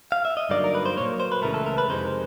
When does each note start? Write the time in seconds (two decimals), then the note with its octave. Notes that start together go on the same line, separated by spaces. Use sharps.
0.12 F5
0.25 E5
0.37 D#5
0.49 G2 D3 F#3 A#3 D#4 D5
0.64 A#4
0.75 B4
0.86 C5
0.97 A#2 F#3 A#3 C#5
1.20 C5
1.32 B4
1.42 C#2 C#3 E3 A3 A#4
1.54 A4
1.66 A#4
1.78 B4
1.89 F2 C3 D#3 G#3 C5